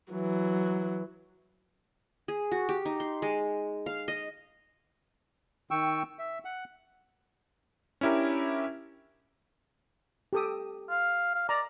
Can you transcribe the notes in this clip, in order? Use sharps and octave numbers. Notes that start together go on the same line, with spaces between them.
E3 F#3
G#4
F#4
G4
D#4
C6
G#3
F5
D#5
D#3 G5 C#6 E6
E5
F#5
C#4 D4 E4 G4 A#4
G4 A4 D#6
F5
F5
D5 A#5